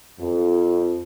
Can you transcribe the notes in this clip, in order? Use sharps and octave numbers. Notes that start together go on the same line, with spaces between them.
F2